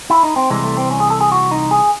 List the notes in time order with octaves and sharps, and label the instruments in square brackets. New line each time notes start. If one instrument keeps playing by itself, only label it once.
[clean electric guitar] E4
D#4
C4
C2 C3 E3 G#3
A3
C4
C#4
G#4
A4
G#4
F#4
D#4
G#4